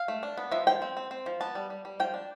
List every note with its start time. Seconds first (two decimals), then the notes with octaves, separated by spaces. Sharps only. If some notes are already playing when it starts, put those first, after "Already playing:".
Already playing: F5
0.08 A3
0.23 D4
0.37 B3
0.52 F3 E5
0.67 F3 G5
0.82 C4
0.97 C4
1.11 C4
1.26 F3
1.41 B3 A5
1.55 G3
1.70 G3
1.85 G3
2.00 F3 G5
2.14 D4